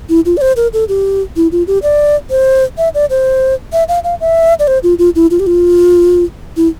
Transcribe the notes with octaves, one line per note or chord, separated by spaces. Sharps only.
E4
F4
D5
C5
A#4
A4
G4
E4
F4
G4
D5
C5
E5
D5
C5
E5
F5
F5
E5
D5
C5
F4
F4
E4
F4
G4
F4
E4